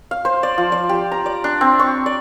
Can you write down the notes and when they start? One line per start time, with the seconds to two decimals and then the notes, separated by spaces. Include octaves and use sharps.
0.11 F5
0.25 C5
0.43 D5
0.58 F3
0.72 D5
0.89 G4
1.12 A#5
1.26 D5
1.44 D4
1.61 C4
1.79 C#6
2.06 D5